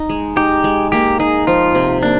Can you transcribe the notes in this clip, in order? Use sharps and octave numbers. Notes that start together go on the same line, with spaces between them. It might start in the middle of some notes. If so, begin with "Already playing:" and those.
Already playing: D#4
G#3
D#4 G4
G#3
A#3 G4
D#4 G#4
F3 F4
C3
A#3 D4